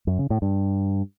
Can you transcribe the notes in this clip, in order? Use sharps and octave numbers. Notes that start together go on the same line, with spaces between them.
F#2
C#3
A2
G2